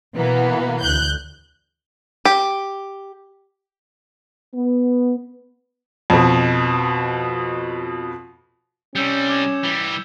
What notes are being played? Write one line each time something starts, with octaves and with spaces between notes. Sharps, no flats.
B2 E3 A#3 B3
D2 F#6 G6
G4
B3
F2 B2
C3 G3 C#4 E6 G6 C#7
D6 G#6 E7
E3 G3